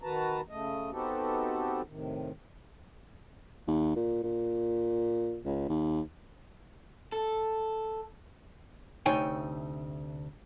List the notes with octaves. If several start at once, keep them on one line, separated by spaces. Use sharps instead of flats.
D#3 F#4 B4 A5 A#5
C#3 A3 D#5
B3 C4 D#4 F#4 G4 A4
A2 C3 D#3
D#2
A#2
A#2
C#2
D#2
A4
D2 C3 D#4 C#5 G5 G#5